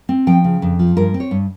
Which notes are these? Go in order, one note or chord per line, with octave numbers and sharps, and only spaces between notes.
C4
F3 G5
C#3
F2
F3
G2 A#4
C4
C#5
G2